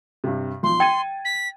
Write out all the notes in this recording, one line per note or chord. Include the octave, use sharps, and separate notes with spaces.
G2 C3
B1 F3 C6
G5 G#6 A6 D#7
B6